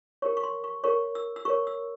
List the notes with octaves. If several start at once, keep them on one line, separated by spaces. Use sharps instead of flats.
G4 A#4 C#5 C#6
C#6
C6
C#6
G4 A#4 C#5 C#6
E6
E6
G4 A#4 C#5 C#6
E6